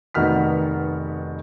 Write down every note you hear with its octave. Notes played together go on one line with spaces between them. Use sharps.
F1 D#3 B3 F#4 F6 B6